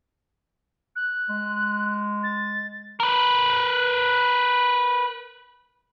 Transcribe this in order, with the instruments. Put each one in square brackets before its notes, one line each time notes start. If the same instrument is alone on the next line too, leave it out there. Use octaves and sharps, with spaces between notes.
[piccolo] F#6
[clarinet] G#3
[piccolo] A6
[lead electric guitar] A#4 B4